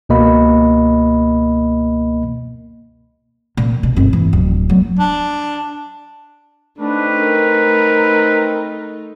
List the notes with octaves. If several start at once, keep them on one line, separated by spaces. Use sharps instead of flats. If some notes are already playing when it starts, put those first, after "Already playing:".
C#2 B2 A#3 D#5 B5
A#2
B2
G1 C4
E3
D1
F#3 B3
D4
A3 C4 D4 D#4 B4
A#4